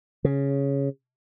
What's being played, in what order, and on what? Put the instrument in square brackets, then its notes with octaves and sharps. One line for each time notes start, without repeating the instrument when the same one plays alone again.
[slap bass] C#3